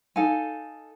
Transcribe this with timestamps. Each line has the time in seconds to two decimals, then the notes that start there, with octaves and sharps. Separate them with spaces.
0.16 D#4 A4 F5 G#5